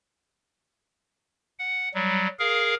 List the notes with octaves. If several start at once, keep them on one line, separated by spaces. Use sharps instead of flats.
F#5
F#3 G3
G#4 A#4 F5